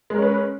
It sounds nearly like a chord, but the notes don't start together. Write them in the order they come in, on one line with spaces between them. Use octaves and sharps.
G#3 A#4 C#4 B4